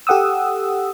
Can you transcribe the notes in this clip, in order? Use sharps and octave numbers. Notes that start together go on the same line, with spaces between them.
G4 A4 F#5 D#6 E6